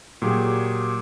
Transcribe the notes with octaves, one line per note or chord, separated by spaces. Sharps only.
A#2 F#3 G4 G#4